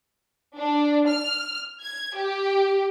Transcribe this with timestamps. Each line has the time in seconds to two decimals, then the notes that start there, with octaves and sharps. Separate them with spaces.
0.56 D4
1.08 F6
1.82 G#6
2.17 G4